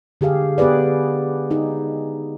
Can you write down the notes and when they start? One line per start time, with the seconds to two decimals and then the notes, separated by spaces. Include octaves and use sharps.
0.21 D3 G4 G#4 F5
0.58 B3 G4 G#4 B4 D5
1.51 D#4 G#4